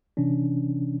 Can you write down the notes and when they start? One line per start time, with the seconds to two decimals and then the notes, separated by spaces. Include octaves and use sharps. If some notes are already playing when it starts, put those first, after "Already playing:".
0.17 C3 E3 C#4 D4